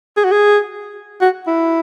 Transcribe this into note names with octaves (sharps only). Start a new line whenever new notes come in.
G#4
F#4
G#4
F#4
E4